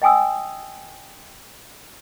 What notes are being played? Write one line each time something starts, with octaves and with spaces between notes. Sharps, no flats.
D#5 G5 G#5 D#6 E6